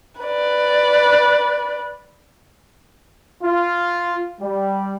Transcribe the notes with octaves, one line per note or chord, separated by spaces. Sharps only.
B4 D5
F4
G3